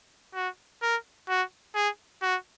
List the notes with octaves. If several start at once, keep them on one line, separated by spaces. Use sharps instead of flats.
F#4
A#4
F#4
G#4
F#4